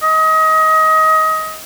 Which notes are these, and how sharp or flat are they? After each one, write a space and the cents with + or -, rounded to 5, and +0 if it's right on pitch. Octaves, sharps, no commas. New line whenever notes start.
D#5 +25